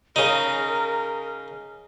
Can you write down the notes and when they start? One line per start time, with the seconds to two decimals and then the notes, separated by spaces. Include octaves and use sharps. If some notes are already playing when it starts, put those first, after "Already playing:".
0.16 C#3 D#4 A#4